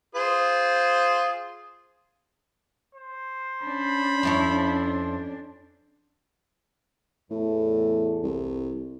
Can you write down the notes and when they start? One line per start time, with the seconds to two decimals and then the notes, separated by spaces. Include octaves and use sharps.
0.15 F4 G#4 C5
2.94 C5
3.63 C#4 D4 B5
4.23 F2 E4 C#5
7.31 E2 A2 A4
8.24 C2